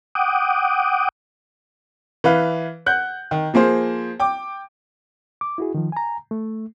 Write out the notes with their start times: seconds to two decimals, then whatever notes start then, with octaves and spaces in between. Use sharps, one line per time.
0.15 F#5 G5 D6 D#6
2.24 E3 B4 F5
2.86 F#5 F#6 G6
3.31 D#3
3.54 F3 A#3 G#4 C5
4.20 G5 D6
5.41 D6
5.58 E4 F#4 G#4
5.75 D#3 F3
5.92 G#5 A#5
6.31 A3